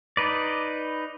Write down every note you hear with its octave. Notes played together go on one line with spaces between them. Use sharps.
D#4 B4 D5